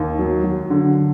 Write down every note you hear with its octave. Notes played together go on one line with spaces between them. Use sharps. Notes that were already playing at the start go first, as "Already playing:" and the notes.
Already playing: D#2
F#3
F#3
D3